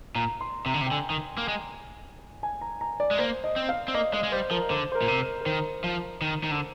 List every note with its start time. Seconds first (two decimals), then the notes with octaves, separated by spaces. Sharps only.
0.15 A#2 A#5
0.41 C6
0.66 C3 A#5
0.74 D3
0.81 C3
0.87 G5
0.91 D3 G#5
1.10 D#3
1.38 A#3
1.48 G#3
2.43 G#5
2.61 A#5
2.81 A#5
3.00 D5
3.11 G#3
3.18 A#3 C5
3.44 D#5
3.56 C4
3.69 F5
3.88 C4
3.94 A#3 D#5
4.13 G#3 D#5
4.24 G#3
4.32 G3 C5
4.51 F3 A#4
4.70 D3 C5
4.92 C5
4.95 A#4
5.02 A#2
5.08 C3
5.21 A#4
5.41 A#4
5.46 D#3 C5
5.84 F3
6.21 D#3
6.43 D#3
6.51 D3